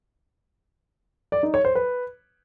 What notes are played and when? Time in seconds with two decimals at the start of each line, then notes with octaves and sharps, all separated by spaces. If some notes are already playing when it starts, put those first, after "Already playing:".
1.32 D5
1.43 D#4
1.54 C#5
1.65 C5
1.75 B4